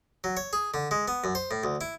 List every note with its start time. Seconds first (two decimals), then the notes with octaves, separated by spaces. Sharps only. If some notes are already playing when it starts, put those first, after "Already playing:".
0.24 F#3
0.37 C#5
0.53 G#4
0.74 D3
0.91 G#3
1.08 B3
1.24 F#2
1.35 C5
1.51 A2
1.64 D2
1.81 E4